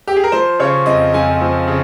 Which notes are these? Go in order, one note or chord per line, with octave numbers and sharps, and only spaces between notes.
G4
G#4
A#4
F3 C5
C#3 C#5
F2 D#5
F2 G#5
F3
C#3